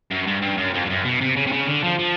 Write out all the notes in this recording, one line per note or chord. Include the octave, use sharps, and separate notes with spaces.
F#2
G2
G2
F#2
F2
G2
F#2
B2
C3
C#3
C3
C#3
D3
F3
F3